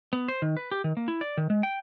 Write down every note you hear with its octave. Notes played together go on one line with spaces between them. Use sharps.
B3
C5
D#3
B4
G4
D#3
A#3
E4
D5
D#3
G#3
G5